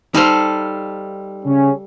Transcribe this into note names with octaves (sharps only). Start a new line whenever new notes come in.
G3 D#4 A4 C5 F5
C#3 C#4